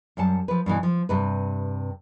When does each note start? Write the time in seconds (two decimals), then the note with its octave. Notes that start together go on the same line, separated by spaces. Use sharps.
0.17 F#2 G3 F#5 A5
0.48 F3 B4
0.66 G2 B2 E3
0.83 F3
1.09 G2 C3 B4